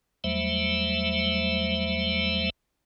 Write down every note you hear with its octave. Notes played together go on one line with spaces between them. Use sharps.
E2 F#3 G3 A3 C5 E5